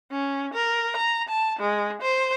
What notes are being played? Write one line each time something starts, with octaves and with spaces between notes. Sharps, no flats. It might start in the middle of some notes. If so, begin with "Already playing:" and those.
C#4
A#4
A#5
A5
G#3
C5